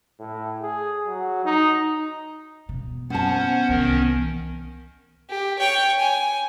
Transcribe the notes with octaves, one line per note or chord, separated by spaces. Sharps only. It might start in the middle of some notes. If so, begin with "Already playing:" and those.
A2
G#4
F#3
D#4
B2
B3 C#4 C5 F#5 A5
C2 D#3 E3 C#4 A#4
G4
C#5 G5
G#5